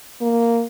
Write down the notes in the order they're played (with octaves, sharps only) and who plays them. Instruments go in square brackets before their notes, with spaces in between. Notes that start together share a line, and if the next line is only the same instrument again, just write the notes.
[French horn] A#3